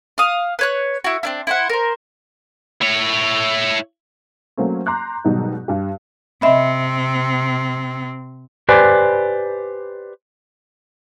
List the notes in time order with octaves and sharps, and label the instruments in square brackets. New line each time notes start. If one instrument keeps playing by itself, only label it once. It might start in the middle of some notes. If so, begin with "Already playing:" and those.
[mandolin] F5 D#6
B4 C#5 F#6
E4 F#4
C4 D4 E4
E4 C5 F#5
A#4 C5
[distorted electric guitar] E4 C#5
[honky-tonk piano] F#3 A3 A#3 C4 C#4
A#5 C6 D6 F#6 G6
G#2 B2 D#3 F#3 G3 D#4
G2 G4
[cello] C3 C4 [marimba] D#5 E5 B5
[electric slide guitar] G4 B4 C5 D5 G#5